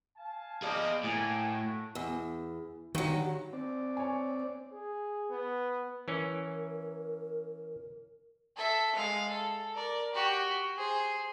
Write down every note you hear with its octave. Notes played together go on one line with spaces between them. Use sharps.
F5 G#5 A5
G#4 D5 D#5 F5
A2 A#3 G#5
A3 E4 F#4
E2
G2 D#3 F#3
C4 D5
C#5 G#5
G#4
B3
E3 C#4 A#4
A4 E5
G#3 F5
A4
A#4 D5
F#4 G4
G#4 C5